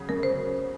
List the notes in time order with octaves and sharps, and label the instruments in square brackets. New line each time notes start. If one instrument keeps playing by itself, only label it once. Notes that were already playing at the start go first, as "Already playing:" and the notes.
Already playing: [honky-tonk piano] C#3 F#3
[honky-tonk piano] F#2 [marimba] A#4
[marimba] C5